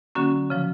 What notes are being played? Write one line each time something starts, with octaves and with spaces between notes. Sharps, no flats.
D3 F#3 A#3 C#4 F#4
C#3 F3